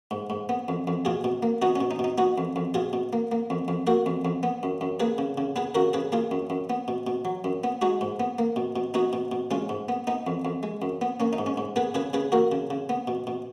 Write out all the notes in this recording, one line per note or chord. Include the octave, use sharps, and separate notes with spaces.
G#2
G#2
B3
F2
F2
B2 F4 G#4
B2
A#3
B3 D#4 F#4
C#4
B2
D#4
B2
D#4
B3 D#4 F#4
F2
F2
B2 F4 G#4
B2
A#3
A#3
F2
F2
A#3 F#4 A#4
F2
F2
B3
F#2
F#2
A#3 G#4 B4
C#3
C#3
B3 G#4 B4
C#3 F#4 A#4
C#3 G#4 B4
A#3 F4 G#4
F#2
F#2
B3
B2
B2
F#3
F#2
B3
G#3 D#4 F#4
G#2
B3
A#3
B2
B2
B3 D#4 F#4
B2
B2
G#3 C#4 F4
G#2
B3
B3 D#4
F2
F2
G#3
F#2
B3
A#3 C#4
D#4
G#2
C#4
G#2
B3 G#4 B4
C#3 G#4 B4
C#3 G#4 B4
A#3 F#4 A#4
C#3
C#3
B3
B2
B2